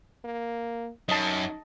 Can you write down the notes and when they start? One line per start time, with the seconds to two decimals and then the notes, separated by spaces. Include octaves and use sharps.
0.25 A#3
1.09 F#2 D#4 D#5 A5